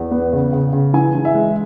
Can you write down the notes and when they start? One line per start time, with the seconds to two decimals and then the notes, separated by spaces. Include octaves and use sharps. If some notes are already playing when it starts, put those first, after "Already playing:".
Already playing: E2
0.11 B3
0.33 C#3
0.53 C#3
0.73 C#3
0.94 E3 G#5
1.15 E3
1.25 E5
1.34 G#3